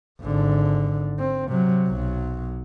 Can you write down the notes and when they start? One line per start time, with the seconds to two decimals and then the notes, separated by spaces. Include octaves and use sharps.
0.21 G#1 D3
1.19 C4
1.48 C3 F#3
1.87 B1 F#3